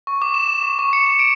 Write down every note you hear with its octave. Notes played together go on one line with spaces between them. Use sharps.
C#6
D6
E7
D6
C#6
C#6
C#7
C#7
D7